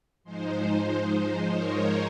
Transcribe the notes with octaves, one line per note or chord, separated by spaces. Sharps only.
G#2 F3 G#3 D#4 C5
C5
A#4 C#5